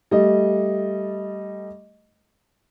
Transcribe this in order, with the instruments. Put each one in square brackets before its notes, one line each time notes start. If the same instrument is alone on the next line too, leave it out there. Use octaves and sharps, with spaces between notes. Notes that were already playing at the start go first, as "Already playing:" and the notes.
[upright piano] G3 A3 D#5